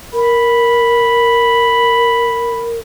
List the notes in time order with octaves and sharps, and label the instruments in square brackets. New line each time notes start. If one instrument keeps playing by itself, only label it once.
[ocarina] A#4 [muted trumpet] B5